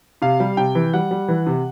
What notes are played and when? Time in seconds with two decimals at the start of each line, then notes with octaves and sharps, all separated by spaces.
0.22 C3 F5
0.40 G3
0.57 C3 G5
0.75 E3
0.94 G3 F#5
1.11 G3
1.28 E3
1.47 C3